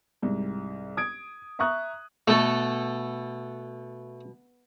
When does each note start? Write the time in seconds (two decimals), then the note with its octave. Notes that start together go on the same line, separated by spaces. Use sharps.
0.22 C2 G#2
0.97 D#6 G#6 D7
1.59 E5 A#5 C#6 D#6 F#6
2.28 B2 A3 A4